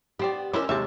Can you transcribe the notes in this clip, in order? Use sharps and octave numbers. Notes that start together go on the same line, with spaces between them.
B3 G4 C5 D5
C#4 D4 E4 A#4 C5 D6 E6
D#2 C3 G#3 C#5 E5 A5